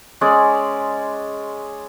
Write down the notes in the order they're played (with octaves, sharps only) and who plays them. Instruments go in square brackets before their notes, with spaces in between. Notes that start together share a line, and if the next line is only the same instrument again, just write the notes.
[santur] G#3 C#4 D5